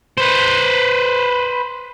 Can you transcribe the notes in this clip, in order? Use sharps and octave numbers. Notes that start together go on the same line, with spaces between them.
B4 C5